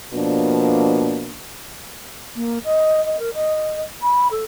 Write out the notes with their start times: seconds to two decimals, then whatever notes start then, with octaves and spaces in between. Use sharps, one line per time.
0.14 B2 F3 A#3 D4
2.36 A#3
2.64 D#5
3.04 D#5
3.19 A#4
3.34 D#5
4.02 B5
4.31 A4